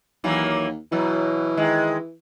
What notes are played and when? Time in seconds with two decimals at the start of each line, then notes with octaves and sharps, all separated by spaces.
0.24 D#2 E3 F#3 A#3
0.92 B2 E3 F#3
1.57 D#3 G#3